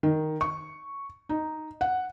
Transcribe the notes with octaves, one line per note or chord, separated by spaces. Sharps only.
D#3
C#6
D#4
F#5